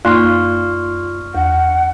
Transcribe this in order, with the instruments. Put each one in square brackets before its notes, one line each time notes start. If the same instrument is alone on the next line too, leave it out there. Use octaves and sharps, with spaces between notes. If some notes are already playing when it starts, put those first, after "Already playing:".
[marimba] F#2 A#3 F#6 [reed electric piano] F4 C6 [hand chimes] D5 C#6 F6
[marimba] E2 [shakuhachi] F#5